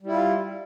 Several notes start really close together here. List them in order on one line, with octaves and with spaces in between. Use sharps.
G3 E4 F4